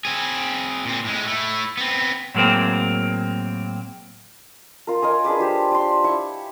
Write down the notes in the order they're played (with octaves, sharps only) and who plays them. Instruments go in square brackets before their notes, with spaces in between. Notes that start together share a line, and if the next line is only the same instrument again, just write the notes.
[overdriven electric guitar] C4 G#4
A#2 C4
A2 G#3
A3 E4
B3 C4
[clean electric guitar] A2 F#3 G#3 A#3 C4
[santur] F4 A#4
A#4 C#5 D#5 G#5
D4 G#4 B4 D6
F4 G4 C5
D5 C6
E4 C#6